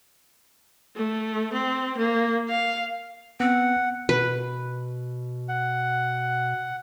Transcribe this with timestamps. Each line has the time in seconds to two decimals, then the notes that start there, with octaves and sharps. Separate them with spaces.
0.96 A3
1.53 C4
1.97 A#3
2.49 F5
3.40 B3 C4 F#5
4.09 B2 B4
5.49 F#5